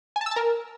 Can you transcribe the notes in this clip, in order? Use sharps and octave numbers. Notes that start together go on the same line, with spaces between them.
G#5
A5
E6
A5
A#4